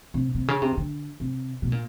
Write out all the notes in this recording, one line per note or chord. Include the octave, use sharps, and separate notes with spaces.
C3
C3
C#3
C3
D3
C3
B2
A#2